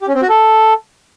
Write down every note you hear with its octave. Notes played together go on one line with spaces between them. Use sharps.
G4
C#4
C4
F#4
A4